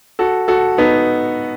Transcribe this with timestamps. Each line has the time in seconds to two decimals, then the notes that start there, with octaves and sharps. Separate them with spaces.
0.19 F#4 A4
0.48 F#4 A4
0.78 B3 D#4